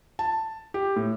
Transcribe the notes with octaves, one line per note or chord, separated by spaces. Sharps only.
A5
G4
A2